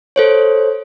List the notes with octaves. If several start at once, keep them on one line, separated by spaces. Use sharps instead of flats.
A4 C5 C#5